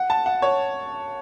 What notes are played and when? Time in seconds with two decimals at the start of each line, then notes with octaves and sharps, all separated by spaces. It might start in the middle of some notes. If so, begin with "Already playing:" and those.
Already playing: F#5
0.10 A5
0.26 F#5
0.42 C#5